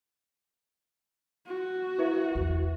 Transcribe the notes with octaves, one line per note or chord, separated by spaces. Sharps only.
F#4
E4 B4 E5
E2